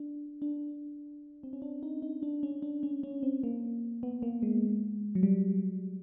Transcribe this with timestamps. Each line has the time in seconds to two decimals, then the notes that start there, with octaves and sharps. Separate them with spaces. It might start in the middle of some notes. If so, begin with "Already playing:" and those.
Already playing: D4
0.42 D4
1.43 C4
1.53 C#4
1.62 D4
1.83 D#4
2.02 D#4
2.23 D4
2.43 C#4
2.62 D4
2.83 C#4
3.03 C#4
3.23 C4
3.43 A#3
4.03 B3
4.22 A#3
4.43 G#3
5.15 F#3
5.23 G3